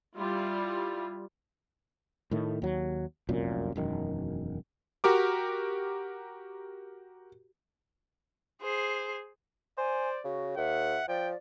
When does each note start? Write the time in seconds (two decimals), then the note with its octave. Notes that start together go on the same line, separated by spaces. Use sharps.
0.16 G3 E4 F4
2.31 A2 D#3 A3
2.62 D#2 F#3
3.29 F1 C2 F#2 A#2
3.76 E1 F#2 D#3
5.04 F#4 G4 A#4 D6
8.62 G#4 C5
9.78 C5 D5 G#5
10.24 C#3 F#4
10.57 D#2 E5 F#5
11.08 F3 D5 G5